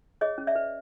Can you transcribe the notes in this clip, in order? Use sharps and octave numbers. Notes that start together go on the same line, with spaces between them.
G#4 C#5 D#5
C#4
D5 E5
B4